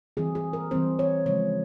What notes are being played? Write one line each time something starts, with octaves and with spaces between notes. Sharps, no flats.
E3 G3 C4 G#4
G#4
A#4
E3 G3 C4 C5
C#5
C#3 F3 G#3 C#5